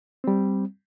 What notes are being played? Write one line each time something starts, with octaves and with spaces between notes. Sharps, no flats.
G3 C4